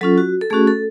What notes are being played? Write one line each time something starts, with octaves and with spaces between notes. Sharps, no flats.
F#3 C#4 F4 A4
F#4
A4
A3 C#4 F#4 G#4
A4